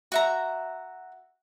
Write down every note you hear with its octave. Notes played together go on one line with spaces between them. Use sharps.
F#4 E5 A#5